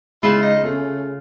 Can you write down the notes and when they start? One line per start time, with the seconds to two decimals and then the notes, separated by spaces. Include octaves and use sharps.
0.23 C#3 G#3 E4 F4
0.42 D#4
0.64 A3 C#4